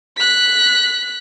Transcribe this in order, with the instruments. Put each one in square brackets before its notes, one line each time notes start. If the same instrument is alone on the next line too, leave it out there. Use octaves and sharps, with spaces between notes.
[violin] F#6 B6